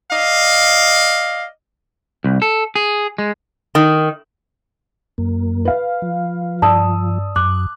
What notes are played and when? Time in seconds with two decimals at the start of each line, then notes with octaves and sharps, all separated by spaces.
0.12 D5 D#5 F5
2.24 C2
2.42 A4
2.75 G#4
3.18 G#3
3.75 D#3
5.18 F#2 A#3
5.65 B4 F5
6.02 F3
6.62 G2 D5 A5 D#6 E6
7.36 F#2 D6 F#6